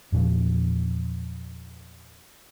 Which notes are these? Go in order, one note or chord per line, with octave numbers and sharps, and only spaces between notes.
E2 A#2 C#3 F3